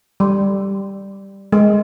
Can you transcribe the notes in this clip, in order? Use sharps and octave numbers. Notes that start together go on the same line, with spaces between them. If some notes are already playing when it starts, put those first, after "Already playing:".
G3
G#3